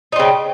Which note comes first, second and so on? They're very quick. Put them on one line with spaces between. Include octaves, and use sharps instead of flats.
D#4 C4 C#3